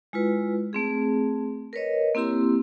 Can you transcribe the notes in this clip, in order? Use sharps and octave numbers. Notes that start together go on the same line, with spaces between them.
G#3 E4 F4 B4
A3 C4 G#4
A#4 B4 C#5 D#5
A#3 C4 E4 G4 C6